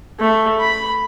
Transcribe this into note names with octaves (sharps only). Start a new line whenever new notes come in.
A3
B5